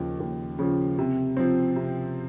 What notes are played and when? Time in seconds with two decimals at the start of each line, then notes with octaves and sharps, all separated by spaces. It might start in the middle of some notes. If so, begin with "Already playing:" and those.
Already playing: D#2 C#3 F3
0.20 D#2
0.59 C#3 F3
0.99 C3
1.37 F3 C4
1.76 C3